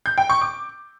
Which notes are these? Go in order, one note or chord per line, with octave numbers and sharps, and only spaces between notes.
G6
G5
C#6
D6